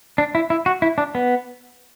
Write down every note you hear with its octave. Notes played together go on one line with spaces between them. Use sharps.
D4
E4
E4
F#4
E4
D4
B3